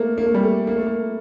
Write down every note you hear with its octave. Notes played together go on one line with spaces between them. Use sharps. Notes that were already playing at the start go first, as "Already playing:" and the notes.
Already playing: A3 A#3
A#3
A3
G3
A3
A#3
A3
A#3